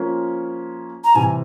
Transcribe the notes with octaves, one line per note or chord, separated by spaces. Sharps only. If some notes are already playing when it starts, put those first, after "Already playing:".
Already playing: F3 A#3 C#4 F4 C5
A#5
C3 E3 G3 G#5